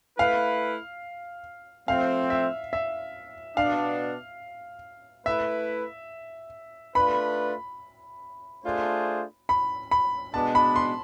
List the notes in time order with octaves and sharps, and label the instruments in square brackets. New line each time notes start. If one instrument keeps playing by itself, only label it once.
[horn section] A3 E4 B4 [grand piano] F5
[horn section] F3 A3 C4 [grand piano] F5
[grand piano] E5
E5
[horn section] B2 B3 D4 [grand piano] F5
[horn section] A3 E4 B4 [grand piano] E5
[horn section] A3 D4 F4 B4 [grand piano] B5
[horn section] A3 D4 F4 G#4 C5
[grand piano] B5
B5
[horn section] B2 G#3 B3 D4 [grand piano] A5
[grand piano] B5
C6